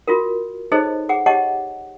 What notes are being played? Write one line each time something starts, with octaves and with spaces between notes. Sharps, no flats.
F4 F#4 A#4
D#4 G#4 A4 C5 C#5 D#5
G#4 F#5 D6
G4 C#5 D#5 F#5 A5 D6